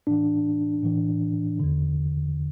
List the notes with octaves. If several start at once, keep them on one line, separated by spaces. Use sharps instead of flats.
A2 E3 D4
A2 E3
E2 D3